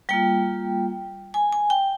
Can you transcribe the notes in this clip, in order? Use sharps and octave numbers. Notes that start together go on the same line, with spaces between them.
G3 A#3 F4 G5
G#5
G#5
G5